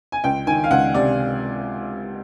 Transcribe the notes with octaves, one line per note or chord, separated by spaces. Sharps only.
G#5
C#2 G5
D#3 G#5
F5
C#2 F#5
C3 D5